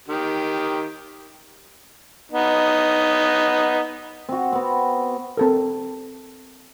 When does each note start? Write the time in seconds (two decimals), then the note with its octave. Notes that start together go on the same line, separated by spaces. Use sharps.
0.08 D#3 G4
2.32 B3 D#4
4.29 C4 F#4
4.53 B3 C4
5.37 C4 A4 A#4